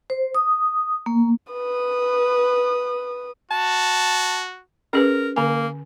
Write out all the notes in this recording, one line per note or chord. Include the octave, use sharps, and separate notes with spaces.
C5
D#6
A#3
B4 D#6
F#4 A5
C#4 G#4 A#4 B4
D3 A#3 G#5